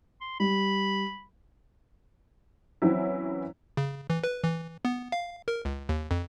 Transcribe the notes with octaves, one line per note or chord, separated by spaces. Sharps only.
C6
G3 B5
E3 F#3 C4 C#4 E4
C#3
E3
B4
E3
B3
F5
A#4
C#2
D#2
F2